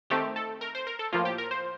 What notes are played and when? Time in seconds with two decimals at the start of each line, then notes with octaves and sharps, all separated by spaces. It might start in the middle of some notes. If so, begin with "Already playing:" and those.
0.10 D#3 A3 C4 G4
0.36 A4
0.61 A#4
0.75 C5
0.87 A#4
0.99 A4
1.12 A2 F3 A#3 F4
1.25 G4
1.38 A#4
1.51 C5